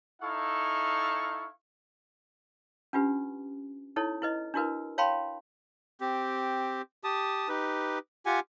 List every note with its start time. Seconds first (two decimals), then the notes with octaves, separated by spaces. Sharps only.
0.23 D#4 E4 A4 F5 C#6
2.93 C#4 D4 F4 G4 B4
3.96 D#4 E4 A4 C#5
4.22 E4 B4 D#5
4.54 D4 E4 F#4 A#4 B4
4.98 C#5 F5 G5 A5 B5 C6
6.01 C4 G4
7.04 G4 A5 D#6
7.49 D#4 G4 B4
8.26 F4 G4 F#5 G#5